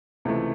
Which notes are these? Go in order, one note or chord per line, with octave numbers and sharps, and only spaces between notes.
C#2 C3 E3 A3